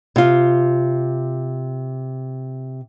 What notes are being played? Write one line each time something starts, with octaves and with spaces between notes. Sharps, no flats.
C3 F4